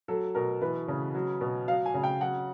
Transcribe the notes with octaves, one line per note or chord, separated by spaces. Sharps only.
F#3 A4
B2 A#4
E3 B4
C#3
F#3
B2
F#3 F5
G#5
C#3
G5
F#3 F#5